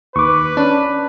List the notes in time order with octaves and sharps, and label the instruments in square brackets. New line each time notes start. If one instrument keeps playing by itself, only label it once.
[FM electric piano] D#2 [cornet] B4 [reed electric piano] C#6 D6
[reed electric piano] C#4 [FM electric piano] D4